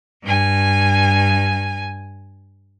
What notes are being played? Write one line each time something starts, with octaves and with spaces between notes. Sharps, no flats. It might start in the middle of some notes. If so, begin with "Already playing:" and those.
G2 G#5